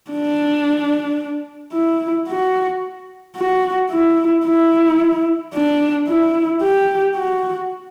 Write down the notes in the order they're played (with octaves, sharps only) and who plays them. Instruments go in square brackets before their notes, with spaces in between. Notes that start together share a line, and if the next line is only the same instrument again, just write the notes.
[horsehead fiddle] D4
E4
F#4
F#4
E4
E4
D4
E4
G4
F#4